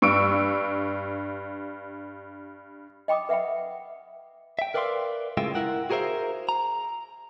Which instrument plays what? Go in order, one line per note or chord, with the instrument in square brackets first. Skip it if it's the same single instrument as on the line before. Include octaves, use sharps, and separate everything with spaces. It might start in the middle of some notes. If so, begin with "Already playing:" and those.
[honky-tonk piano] G2 C#6 E6 D7
[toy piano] D#5 G5 B5 D6 D#6
B4 E5 F#5 G5 B5
[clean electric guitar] E5 G5
A#4 B4 D5 E5 F5 C6
A2 C#3 G#3 F4 E5 G5
E4 A#4 F#5 G5
F#4 G#4 A#4 C5 E5 F5
A#5